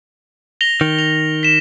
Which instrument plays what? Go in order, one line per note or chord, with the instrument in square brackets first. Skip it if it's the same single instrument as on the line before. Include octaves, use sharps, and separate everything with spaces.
[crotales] A#6 F7 G7
[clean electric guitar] D#3
[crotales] F7
B6 E7